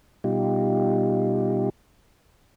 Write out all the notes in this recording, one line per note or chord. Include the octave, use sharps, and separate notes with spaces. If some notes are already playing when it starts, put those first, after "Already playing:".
B2 G3 D#4 F4 G4